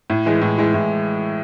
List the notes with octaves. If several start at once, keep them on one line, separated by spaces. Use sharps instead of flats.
A2
E3 G#3
A2
E3 G#3
A2